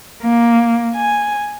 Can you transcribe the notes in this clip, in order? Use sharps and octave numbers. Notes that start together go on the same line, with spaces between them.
A#3
G#5